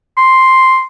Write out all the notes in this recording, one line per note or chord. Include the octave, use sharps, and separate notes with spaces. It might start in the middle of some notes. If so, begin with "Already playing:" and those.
C6